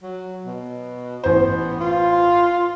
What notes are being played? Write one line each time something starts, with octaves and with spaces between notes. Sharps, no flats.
F#3
B2
A1 B3 C5
F4